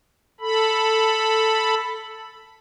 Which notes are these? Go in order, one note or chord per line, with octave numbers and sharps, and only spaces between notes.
A4 B5